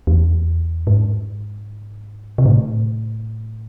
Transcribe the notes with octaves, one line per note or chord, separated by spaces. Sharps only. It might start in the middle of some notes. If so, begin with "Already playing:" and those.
E2
G#2
C3
A2